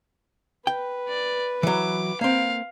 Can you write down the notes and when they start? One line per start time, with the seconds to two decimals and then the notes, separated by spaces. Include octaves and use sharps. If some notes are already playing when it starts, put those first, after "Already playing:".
0.67 B4 G5
1.08 D5
1.63 E3 F#3 D6
2.21 A#3 C4 F5